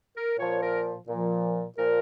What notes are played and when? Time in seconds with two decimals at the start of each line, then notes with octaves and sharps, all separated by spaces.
0.15 A#4
0.38 A#2 F3 C#5
0.62 A#4
1.08 A#2 F3
1.77 A#2 F3 A#4